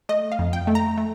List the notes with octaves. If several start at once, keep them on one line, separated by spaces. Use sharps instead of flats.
A3 D#5
F5
F2
G5
A3
A#5
A3